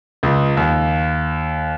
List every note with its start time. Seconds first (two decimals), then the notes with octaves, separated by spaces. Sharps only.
0.23 C#2
0.57 D#2